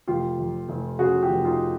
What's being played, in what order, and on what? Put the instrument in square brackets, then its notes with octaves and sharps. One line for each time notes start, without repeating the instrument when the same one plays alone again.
[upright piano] F1 F4 G4
F2
F1
C#3 F#4 G#4
F4 G4
F1
D#4 F4